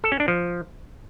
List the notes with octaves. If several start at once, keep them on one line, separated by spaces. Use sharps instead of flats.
A4
C#4
D4
F3